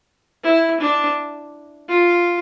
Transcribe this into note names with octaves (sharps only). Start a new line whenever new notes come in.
E4
D4
F4